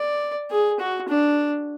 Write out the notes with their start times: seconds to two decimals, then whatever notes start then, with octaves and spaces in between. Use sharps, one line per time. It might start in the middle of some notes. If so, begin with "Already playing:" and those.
Already playing: D5
0.51 G#4
0.80 F#4
1.09 D4